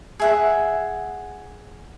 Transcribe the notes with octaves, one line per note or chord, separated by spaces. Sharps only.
G#4 E5 F#5